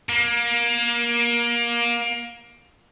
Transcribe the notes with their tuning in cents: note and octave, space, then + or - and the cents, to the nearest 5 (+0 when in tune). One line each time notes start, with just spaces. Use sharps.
A#3 +25